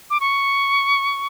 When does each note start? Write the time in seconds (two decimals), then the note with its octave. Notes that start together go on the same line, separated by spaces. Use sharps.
0.10 D6
0.20 C#6